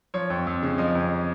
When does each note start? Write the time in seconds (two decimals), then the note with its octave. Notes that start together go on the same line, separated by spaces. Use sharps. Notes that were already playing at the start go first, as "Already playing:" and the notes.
0.14 F3 C#5
0.30 F2
0.47 F2
0.63 C#3
0.78 F3 D#5
0.95 F2